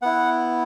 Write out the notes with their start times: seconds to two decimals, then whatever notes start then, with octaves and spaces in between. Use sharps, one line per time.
0.02 B3 E4 F#5